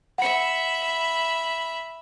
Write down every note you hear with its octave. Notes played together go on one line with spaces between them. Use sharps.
E5 F#5 B5 C#7